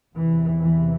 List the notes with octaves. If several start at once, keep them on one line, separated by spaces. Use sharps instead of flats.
E2 C3 E3
E3